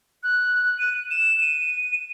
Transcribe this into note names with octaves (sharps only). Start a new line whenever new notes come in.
F#6
D#7
E7
D#7